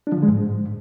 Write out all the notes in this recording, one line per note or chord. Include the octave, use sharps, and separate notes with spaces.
D4
F3
D3
G#3
G#2